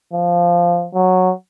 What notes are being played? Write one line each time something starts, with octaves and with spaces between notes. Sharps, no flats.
F3
F#3